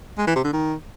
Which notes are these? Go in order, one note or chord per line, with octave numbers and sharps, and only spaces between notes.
G#3
E3
C3
D3
D#3